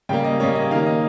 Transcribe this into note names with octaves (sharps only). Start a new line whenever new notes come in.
C#3 G3 A#3 G5
D#5
C#3 G3 A#3 C#5
D#5
D#3 A#3 F5
D#5